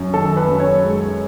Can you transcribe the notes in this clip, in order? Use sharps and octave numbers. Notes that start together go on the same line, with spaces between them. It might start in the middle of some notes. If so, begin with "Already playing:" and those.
Already playing: F#2
D#3 A4
B4
F#2
C#5
G#3